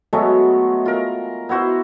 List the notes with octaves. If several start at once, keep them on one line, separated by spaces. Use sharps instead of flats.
F#3 G#3 A3 B3
F4 A#4
B3 E4 F#4 C5